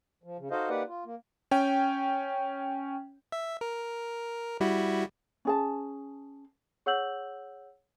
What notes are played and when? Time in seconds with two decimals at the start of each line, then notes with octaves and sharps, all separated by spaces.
0.24 F3
0.39 C#3
0.51 D#4 F#4 A4 C5 D#5 F5
0.69 A#3 D#4 G4 B4 D5 F#5
0.88 F4
1.06 A#3
1.51 C#4 G5
3.32 E5
3.61 A#4
4.60 G3 E4 F#4
5.45 C#4 G#4 A5
6.86 G#4 C#5 F#5 E6 G6 F#7